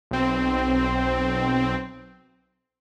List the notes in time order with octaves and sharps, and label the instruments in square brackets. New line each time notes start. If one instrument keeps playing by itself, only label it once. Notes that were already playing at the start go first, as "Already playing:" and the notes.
[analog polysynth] B1 C4